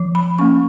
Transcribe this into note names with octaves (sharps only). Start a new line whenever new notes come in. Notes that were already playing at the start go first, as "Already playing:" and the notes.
Already playing: F3
B5
A#3 C#4 C#6